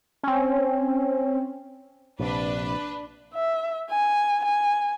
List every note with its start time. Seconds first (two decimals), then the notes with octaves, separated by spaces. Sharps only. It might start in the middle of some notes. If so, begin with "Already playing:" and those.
0.23 C4 C#4
2.19 A#1 C3 D4 B4
3.34 E5
3.90 G#5
4.45 G#5